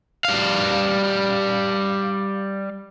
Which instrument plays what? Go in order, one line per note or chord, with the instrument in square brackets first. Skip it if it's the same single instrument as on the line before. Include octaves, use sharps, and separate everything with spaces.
[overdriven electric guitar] G3 F5